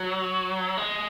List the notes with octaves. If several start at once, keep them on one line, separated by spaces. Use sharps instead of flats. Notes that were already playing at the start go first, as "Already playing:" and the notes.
Already playing: F#3
G#3